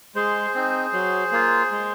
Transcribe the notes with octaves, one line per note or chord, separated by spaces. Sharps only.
G#3 G#4 C5
C4 D#4
F#3
A#3 F4
G#3